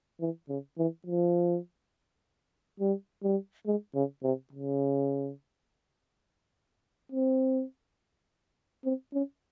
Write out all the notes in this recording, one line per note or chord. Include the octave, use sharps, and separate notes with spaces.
E3
C#3
E3
F3
G3
G3
G#3
C#3
C3
C#3
C4
C4
C#4